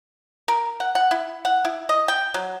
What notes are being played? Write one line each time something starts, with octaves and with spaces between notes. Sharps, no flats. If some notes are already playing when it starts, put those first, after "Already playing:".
A#4
F#5
F#5
E4
F#5
E4
D#5
G5
F#3